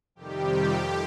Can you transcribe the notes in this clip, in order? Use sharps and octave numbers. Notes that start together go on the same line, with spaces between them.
F2 C3 D#3 G3 G4
F2 F3